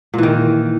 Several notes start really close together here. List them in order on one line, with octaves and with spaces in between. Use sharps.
A#2 E3 D#3